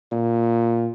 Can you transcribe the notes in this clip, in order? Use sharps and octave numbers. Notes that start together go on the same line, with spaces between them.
A#2